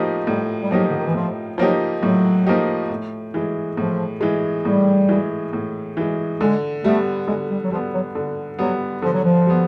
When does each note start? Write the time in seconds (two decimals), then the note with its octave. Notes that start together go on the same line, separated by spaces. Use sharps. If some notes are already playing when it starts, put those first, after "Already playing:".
Already playing: A2 F3 A#3 D#4 G4
0.27 A2 G3
0.63 G3
0.71 F3 F#3 A#3 D#4 G4
0.89 D3
0.97 D#3
1.06 E3
1.14 A2 F3
1.58 F3 F#3 A#3 D#4 G4
2.02 A2 F#3
2.46 F3 A#3 D#4 G4
2.90 A2
3.34 E3 G#3
3.77 A2 F3
4.21 E3 G#3
4.65 A2 G3
5.09 E3 G#3
5.53 A2
5.97 E3 G#3
6.40 D3 G#3
6.84 G3 A3 B3
7.27 D3 G#3
7.50 G3
7.64 F#3
7.71 F3 G3
7.75 B3
7.94 F#3
8.15 D3
8.59 F#3 G3 B3
9.02 D3 F3
9.13 F#3
9.23 F3
9.46 G3 B3